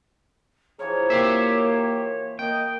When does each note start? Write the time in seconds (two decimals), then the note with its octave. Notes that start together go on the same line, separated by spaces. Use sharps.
0.79 E3 F3 G#4 A#4 C#5
1.10 A#3 G4 C5 E5
2.39 A#3 D#5 G5